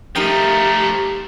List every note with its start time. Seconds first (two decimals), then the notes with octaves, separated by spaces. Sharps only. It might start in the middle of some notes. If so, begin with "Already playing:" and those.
0.16 F3 A3 D#4 G4 A#4 G5